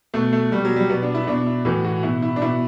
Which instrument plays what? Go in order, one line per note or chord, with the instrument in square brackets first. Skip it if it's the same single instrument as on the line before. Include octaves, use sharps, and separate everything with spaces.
[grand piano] B2 A3
A3
B2 G3
F#3
G3
B2 B3
D4
E4
B2 D4
E4
A2 E3 F#4
F#4
B2 E4
E4
D4
B2 E4